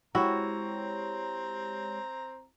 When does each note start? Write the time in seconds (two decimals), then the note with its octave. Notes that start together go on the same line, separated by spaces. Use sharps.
0.15 G#3 C4 E4 F#4 G4 C#5 A#5